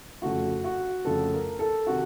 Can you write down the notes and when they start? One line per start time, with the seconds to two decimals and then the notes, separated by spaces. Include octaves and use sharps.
0.22 F2 C#3 A3 F#4
0.64 F#4
1.05 F2 C#3 A3 A4
1.33 A#4
1.59 A4
1.87 C3 D#3 F#4